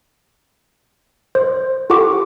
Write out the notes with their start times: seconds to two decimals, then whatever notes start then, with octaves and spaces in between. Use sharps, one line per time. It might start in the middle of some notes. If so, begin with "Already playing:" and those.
1.35 C5
1.90 F4 G4 A4 F#5 C#6 D6